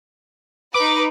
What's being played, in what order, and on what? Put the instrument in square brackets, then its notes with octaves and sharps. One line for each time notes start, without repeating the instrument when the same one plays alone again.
[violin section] D#4 B4 [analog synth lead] D6